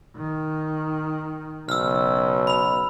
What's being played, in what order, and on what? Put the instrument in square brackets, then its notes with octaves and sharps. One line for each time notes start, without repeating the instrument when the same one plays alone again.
[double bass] D#3
[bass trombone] B1 [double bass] C#3 [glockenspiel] E6 F6
[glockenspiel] B5 F7